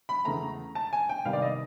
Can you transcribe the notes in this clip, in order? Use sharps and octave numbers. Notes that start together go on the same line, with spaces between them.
B5
E2 C#3 E3 A3 A#5
A5
G#5
G5
C3 D#3 G3 B3 F5
D5
D#5